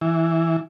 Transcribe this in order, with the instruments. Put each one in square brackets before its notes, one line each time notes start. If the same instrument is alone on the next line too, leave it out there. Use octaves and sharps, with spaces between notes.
[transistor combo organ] E3